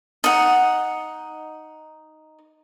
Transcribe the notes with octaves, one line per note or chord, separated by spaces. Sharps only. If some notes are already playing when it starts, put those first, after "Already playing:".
D#4 F#5